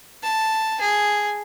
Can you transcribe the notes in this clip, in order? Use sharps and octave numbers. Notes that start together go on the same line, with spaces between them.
A5
G#4